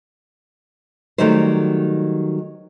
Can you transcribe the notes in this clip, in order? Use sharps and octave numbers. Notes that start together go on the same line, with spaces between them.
D#3 F#3 G3 A3 D#4 C5